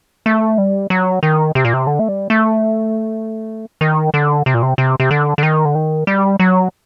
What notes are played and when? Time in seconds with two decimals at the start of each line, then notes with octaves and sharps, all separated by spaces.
0.26 A3
0.58 G3
0.90 F#3
1.23 D#3
1.55 C3
1.65 A#2
1.73 C3
1.87 D3
1.99 A3
2.08 G3
2.30 A3
3.81 D#3
4.14 D3
4.46 C3
4.54 A#2
4.62 C3
4.78 C3
5.00 C3
5.11 D3
5.38 D3
5.43 D#3
5.65 D3
5.75 D#3
6.07 G3
6.39 F#3